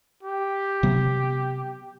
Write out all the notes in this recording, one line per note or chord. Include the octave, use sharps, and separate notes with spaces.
G4
C3 F#3 B3